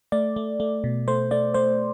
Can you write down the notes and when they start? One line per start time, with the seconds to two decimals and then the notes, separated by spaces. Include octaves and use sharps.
0.12 A3 D5
0.36 A3
0.60 A3
0.84 B2
1.08 A3 C5
1.31 A3 D5
1.54 A3 C5